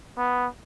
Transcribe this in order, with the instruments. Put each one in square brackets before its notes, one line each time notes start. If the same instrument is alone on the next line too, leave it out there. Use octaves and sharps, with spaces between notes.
[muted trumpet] B3